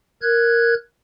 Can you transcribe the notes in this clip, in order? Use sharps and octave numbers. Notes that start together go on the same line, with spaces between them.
A#4 F#6 G#6